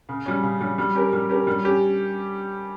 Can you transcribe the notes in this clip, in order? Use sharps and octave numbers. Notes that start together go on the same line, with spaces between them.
C#3
G3 C#4
C#3
G3 C#4
G3
C#4 G4 A#4
G3
C#4 G4 A#4
G3
C#4 G4